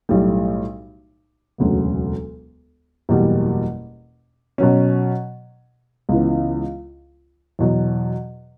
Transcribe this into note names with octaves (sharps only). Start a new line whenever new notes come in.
B1 A2 G3
E1 D2 C#3 F#3 B3
F#1 E2 B2 G3
B2 F#3 C#4
C#2 C#3 E3 B3
E2 B2 F#3